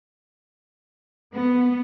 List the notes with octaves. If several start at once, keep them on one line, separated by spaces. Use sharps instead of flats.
B3